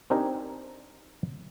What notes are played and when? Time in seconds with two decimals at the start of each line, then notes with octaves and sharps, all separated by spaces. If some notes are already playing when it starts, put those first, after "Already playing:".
0.10 C4 D4 D#4 G4 A#4 G#5